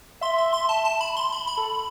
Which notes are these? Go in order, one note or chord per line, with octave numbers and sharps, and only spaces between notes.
E5 C6
C6
C6
A5
A5
B5
C6
B5
B5
A4